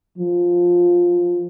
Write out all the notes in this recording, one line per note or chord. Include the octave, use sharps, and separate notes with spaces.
F3